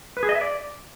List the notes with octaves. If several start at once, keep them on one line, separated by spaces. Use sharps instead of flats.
B4
G#4
D#5
E5
D5